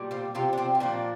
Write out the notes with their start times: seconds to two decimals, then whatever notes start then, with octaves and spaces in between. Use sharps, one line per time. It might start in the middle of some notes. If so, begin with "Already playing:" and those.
Already playing: A#2 G3
0.11 C4 F4
0.35 C3 F3 C4 F4
0.53 D4
0.58 C4 F4
0.75 F4
0.80 A#2 F3 A#3 D4